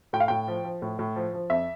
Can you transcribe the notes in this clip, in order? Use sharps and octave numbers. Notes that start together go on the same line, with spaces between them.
A2 G5
F5
A2 G5
F3
F3
A2
A2
F3
F3
F2 E5